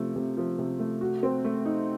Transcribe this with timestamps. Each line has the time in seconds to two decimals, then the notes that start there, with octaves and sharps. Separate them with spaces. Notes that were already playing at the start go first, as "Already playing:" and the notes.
Already playing: C3 F3 A3
0.16 C3
0.37 F3
0.59 C3
0.79 A3
1.01 F#4
1.23 C4
1.45 A3
1.65 D#4